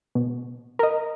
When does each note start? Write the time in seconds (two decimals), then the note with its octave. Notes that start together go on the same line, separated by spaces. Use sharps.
0.15 B2
0.79 A#4 D#5